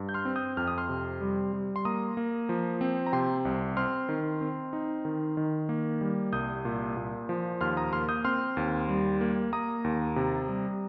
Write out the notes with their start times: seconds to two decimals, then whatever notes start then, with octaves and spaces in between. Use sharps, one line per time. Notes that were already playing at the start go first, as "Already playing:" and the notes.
Already playing: G2
0.09 G6
0.14 C6 F6
0.25 C4
0.36 D#6 G6
0.57 F2 F6
0.67 D#6
0.78 C6 F6
0.89 C3
1.21 G3
1.53 G3
1.76 C6
1.85 A#3 A#5 D#6
2.17 A#3
2.49 F3
2.81 C4
3.06 A#5
3.12 C3 G5 C6
3.45 C2
3.77 C4 C6 F6
4.09 D#3
4.41 C4
4.73 D#4
5.05 D#3
5.37 D#3
5.69 A#3
6.01 G3
6.32 C2 D#6 G6
6.65 A#2
6.97 A#2
7.29 F3
7.61 D#2 C6 F6
7.77 A#5 D#6
7.93 A#3 C6 F6
8.09 D#6 G6
8.25 C4 C6 F6
8.57 D#2
8.89 G3
9.21 A#3
9.52 A#3 A#5 D#6
9.84 D#2
10.16 C3
10.48 G3